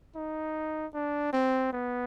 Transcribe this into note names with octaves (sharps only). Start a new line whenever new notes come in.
D#4
D4
C4
B3